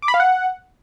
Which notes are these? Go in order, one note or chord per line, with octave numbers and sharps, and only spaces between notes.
D6
B5
F5
F#5